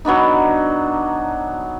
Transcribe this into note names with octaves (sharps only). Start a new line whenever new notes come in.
F#3 B3 D4 D#4